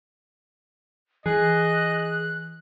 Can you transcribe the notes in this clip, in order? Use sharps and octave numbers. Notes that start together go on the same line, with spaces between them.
E3 G#4 D#5 F#6